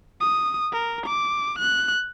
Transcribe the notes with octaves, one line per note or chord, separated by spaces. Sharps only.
D#6
A#4
D6
F#6